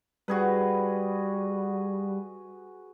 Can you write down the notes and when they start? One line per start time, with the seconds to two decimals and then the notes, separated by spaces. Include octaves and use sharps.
0.28 G3 F#4 G#4 B4